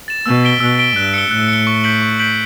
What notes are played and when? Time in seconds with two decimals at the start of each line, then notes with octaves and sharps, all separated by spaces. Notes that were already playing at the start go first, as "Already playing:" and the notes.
0.08 A6 E7
0.26 B2 E6
0.44 B6 D7 G7
0.60 B2 E6
0.78 B6 D7 G7
0.96 G2 F#6
1.14 C#7 G7
1.31 A2 F#6
1.48 C#7 G7
1.67 C#6
1.84 G6 B6 D7 F#7
2.02 C#6
2.19 G6 B6 D7 F#7